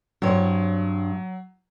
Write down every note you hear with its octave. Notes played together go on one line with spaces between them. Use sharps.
G2 F#3 C4 C#5